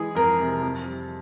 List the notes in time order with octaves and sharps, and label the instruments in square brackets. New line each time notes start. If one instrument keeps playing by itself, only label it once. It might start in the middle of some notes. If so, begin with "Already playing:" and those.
Already playing: [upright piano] E3 G#3 G#4
F2 A#4
C3
F2
G3